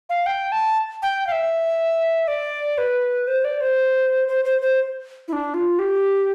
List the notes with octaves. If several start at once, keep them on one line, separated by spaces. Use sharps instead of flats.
F5
G5
A5
G5
F5
E5
D5
B4
C5
D5
C5
C5
C5
C5
E4
D4
F4
G4